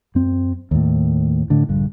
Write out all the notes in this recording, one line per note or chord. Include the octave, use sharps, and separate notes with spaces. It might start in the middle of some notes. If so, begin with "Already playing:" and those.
F#2 C4
D#2 A2
A2 D3
A#1 G2 D3